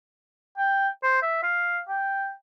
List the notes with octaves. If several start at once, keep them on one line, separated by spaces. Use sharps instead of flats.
G5
C5
E5
F5
G5